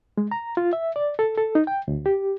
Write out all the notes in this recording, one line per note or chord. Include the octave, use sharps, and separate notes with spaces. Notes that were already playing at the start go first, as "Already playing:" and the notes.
G#3
A#5
F4
E5
D5
A4
A4
D#4
G5
D2
G4